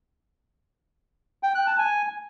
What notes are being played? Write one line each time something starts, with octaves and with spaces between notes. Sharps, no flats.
G5
F#6
A5
G#5